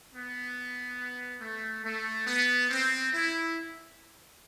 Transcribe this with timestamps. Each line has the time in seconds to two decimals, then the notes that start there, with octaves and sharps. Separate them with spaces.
0.13 B3
1.41 A3
1.85 A3
2.27 B3
2.70 C4
3.13 E4